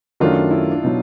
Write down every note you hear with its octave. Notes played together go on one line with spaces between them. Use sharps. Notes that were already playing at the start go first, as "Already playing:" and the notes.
F#2 D#3 F#3 A3 D4 F4
E4
D4
B2 F#3 D#4